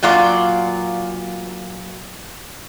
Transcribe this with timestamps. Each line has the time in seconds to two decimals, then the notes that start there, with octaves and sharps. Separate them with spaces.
0.02 A#2 F#3 F4 D5